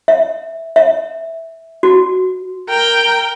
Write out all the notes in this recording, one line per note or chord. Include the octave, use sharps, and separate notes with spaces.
E5
E5
F#4
A#4 G5